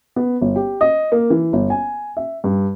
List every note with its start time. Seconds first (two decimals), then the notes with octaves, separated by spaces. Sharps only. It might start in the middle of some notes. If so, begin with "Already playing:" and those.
0.16 B3
0.41 G1
0.56 G4
0.81 D#5
1.12 A#3
1.30 E3
1.53 G1
1.70 G#5
2.17 E5
2.44 G2